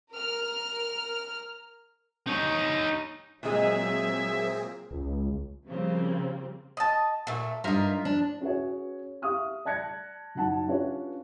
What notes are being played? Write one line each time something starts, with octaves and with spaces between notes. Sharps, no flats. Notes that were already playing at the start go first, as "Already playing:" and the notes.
A#4 F6
D#4 C#5
A#2 F#3 G#3 A#3 C4 G#4 E5
C#2
C#3 F3 G3 A#3 C4
D#5 A5
A#2 A3
G2 D#4 F4 A#4 E5
D4
C#4 F#4 G#4 B4 C#5
G4 E5 F5 C#6 D#6 F6
D5 A5 F#6 G#6 A#6 C#7
F#2 D#4 F#5 A5
C#4 D4 F4 G4 B4 C#5